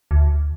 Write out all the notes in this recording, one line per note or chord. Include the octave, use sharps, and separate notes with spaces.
D2